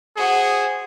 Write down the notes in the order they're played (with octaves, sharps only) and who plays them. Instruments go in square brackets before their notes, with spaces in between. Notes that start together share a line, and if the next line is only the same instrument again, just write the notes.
[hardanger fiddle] F#4 C5 [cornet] G#4